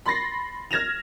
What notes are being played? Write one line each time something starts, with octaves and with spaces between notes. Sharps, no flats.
B5 C6 A6 A#6 C7
F6 G#6 A#6 E7 F7